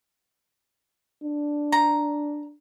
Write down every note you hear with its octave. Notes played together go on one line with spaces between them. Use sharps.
D4
A#5